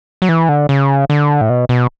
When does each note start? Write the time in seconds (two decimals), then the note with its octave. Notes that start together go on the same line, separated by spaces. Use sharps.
0.22 F#3
0.29 E3
0.49 D3
0.69 C#3
1.10 D3
1.41 A2
1.50 B2
1.69 B2